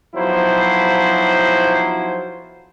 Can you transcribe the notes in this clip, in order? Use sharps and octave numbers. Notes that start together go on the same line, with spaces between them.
B1 F3 F#3 E4 C5